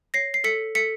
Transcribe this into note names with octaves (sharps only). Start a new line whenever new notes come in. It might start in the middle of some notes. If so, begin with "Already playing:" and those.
C#5 A#6 C7
C7
A4 B6 C#7
A4 B6 C#7